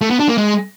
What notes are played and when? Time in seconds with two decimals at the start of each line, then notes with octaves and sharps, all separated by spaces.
0.01 A3
0.10 B3
0.20 D4
0.29 A#3
0.38 G#3